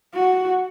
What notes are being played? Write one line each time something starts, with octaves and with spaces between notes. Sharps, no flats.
F#4